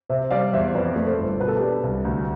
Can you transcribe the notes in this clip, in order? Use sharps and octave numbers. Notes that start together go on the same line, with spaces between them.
C3 C5 E5
G3 D5 F5
E2 C5 E5
F2 B4 D5
A3
A4 C5
G1
B2 B4
A4
D4 G4 B4
C2
D2